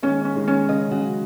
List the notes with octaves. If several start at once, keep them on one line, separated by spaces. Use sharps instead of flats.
D#3 G#3 C#4
C#4
D#3 G#3
C#4
C#3 D#5
C#3 F#3 F#4